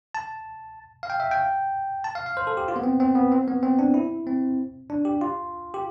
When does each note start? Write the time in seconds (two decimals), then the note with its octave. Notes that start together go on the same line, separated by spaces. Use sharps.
0.15 A5
1.03 F5
1.10 G5
1.20 E5
1.31 G5
2.04 A5
2.15 F5
2.26 F5
2.37 C5
2.47 A4
2.57 G4
2.68 F4
2.76 B3
2.84 C4
3.00 C4
3.15 B3
3.32 C4
3.48 B3
3.63 C4
3.79 D4
3.94 E4
4.27 C4
4.90 D4
5.05 G4
5.21 F4
5.74 G4